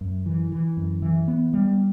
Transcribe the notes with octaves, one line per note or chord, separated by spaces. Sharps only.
F#2
E3
E3
F#2
E3
B3
G3